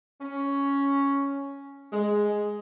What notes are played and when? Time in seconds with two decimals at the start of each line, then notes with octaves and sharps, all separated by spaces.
0.22 C#4
1.93 G#3